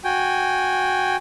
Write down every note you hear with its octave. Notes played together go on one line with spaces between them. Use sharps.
F#4 G5 G#5